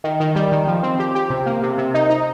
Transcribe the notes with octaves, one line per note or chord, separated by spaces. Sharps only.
D#3
D#3
G3
D#3
F3
C4
G4
G4
C3
A#3
C3
C3
D#4
D#4